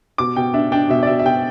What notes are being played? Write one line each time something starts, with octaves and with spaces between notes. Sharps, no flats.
B2 D6
B2 G5
D4 E5
D4 G5
B2 E5
D5
B2 E5
E5
B2 G5